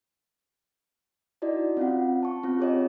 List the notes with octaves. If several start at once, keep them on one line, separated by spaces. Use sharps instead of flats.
D#4 E4 F#4 D5 D#5
C4 C#4 F4 F5 F#5
A5 C#6
C4 C#4 F4
G4 G#4 C#5 D#5